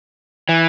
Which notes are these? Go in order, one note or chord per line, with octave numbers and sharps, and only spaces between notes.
E3